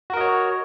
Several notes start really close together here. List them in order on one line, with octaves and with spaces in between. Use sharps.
F#4 A#4 D#5 C#5